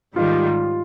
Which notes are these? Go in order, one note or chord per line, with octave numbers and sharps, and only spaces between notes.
G#2 D#3 G3 F4